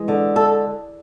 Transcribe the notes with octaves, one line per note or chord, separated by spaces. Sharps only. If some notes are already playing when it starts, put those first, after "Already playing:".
Already playing: E3 G#3
D3
A4